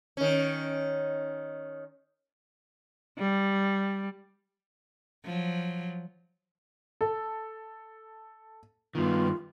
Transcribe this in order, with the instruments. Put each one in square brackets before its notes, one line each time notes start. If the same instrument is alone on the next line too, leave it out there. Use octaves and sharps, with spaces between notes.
[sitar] D#3 C#4
[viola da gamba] G3
F3 F#3
[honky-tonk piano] A4
[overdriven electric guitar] G2 D#3 [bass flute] B3 [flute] F4